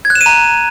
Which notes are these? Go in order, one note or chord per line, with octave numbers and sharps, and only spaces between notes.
G#6
F#6
E7
D#7
A#5